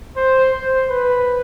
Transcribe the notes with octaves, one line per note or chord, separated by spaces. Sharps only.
C5
C5
B4